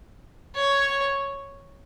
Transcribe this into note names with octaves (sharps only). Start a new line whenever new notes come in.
C#5